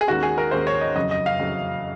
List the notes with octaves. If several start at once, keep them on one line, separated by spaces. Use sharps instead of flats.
G#4
D#2 D#3 G#3 C#4 F#4
G#4
A#4
D#2 D#3 G#3 C#4 C5
C#5
D#5
F#1 F2 C#3 F#3 D#5
D#5
F5
F#1 F2 C#3 F#3